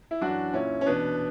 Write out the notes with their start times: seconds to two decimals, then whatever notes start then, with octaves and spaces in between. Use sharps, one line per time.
0.11 E4
0.21 F#2 E3 D4 F#4
0.53 A#2 C#4 E4
0.81 C#4
0.86 E2 B2 B3 D4